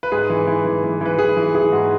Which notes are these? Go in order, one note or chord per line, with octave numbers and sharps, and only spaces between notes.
B4
G#2 G#4
E3
E3
E3
E3
E3 B4
E3 G#4
E3
E3 G#4
G#2 F#4